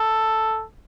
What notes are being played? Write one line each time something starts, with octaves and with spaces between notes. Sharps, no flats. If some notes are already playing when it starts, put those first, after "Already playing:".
Already playing: A4